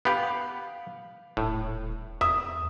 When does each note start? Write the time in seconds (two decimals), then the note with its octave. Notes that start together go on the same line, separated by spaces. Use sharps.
0.05 B3 G4 F5 B5
1.37 D#1 A2
2.21 E2 E5 D#6